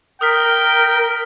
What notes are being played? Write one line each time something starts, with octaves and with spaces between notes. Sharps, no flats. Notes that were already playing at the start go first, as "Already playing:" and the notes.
A#4 G5 D#6 F6 B6